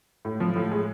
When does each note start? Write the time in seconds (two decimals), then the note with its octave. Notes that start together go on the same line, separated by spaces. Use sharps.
0.25 A2
0.40 F3
0.56 A2
0.72 G#3